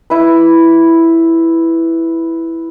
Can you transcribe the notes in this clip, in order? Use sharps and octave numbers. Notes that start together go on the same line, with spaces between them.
E4 B4